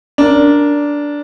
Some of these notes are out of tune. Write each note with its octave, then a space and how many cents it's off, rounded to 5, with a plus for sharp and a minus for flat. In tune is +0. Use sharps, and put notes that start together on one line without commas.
D4 -10 A#4 +0